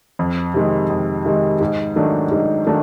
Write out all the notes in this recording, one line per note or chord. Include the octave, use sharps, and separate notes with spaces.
F2
C3 D#3 G#3
F2
C3 D#3 G#3
G#2
D#3 F#3 A3 D4
G#2
D#3 F#3 A3 D4